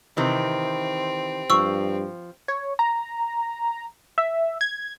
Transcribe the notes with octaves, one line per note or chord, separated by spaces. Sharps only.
C3 D#3 E3 C4
G2 F3 C#6 E6
C#5
A#5
E5
G#6